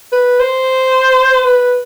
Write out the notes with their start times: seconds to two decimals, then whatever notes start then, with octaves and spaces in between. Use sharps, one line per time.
0.12 B4
0.40 C5
1.45 B4